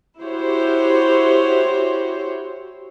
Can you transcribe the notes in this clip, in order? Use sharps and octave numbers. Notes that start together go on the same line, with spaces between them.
E4 F#4 G4 C5 C#5